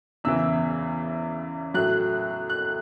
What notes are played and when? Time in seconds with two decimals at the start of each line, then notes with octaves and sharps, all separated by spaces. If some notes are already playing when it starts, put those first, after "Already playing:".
0.24 E2 C#3 E3 E6
1.74 A2 F#3 F#6
2.50 F#6